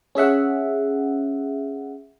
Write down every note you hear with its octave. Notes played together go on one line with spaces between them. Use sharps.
C#4 G#4 E5 F#5